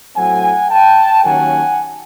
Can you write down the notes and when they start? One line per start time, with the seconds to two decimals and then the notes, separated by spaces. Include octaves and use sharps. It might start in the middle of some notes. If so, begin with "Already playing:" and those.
0.15 A2 F#3 A3 C4 F#5 G#5
0.69 G5 A5
1.23 D#2 D#3 F#3 A#3 C#4 F#5 G#5